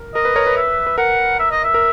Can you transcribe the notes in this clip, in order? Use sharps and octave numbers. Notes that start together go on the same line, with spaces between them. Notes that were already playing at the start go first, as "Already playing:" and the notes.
Already playing: A#4
A#4 D#5
B4
A#4 C#5
B4
E5
B4
A#4 F#5
E5
D#5
E5
A#4